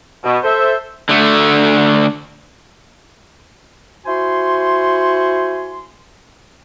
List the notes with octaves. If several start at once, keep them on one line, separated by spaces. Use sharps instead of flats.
B2
A4 C5 E5
D3 A3
E4 F#4 C5 G#5 C6